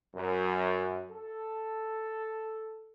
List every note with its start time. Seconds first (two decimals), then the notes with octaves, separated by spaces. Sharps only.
0.16 F#2
1.11 A4